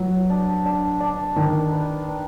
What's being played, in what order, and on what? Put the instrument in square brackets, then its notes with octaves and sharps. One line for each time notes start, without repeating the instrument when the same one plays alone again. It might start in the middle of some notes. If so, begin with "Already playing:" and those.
Already playing: [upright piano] F#3 [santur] B4
[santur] D4
D4
D4
[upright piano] D#3 [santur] D4
[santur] B4
D4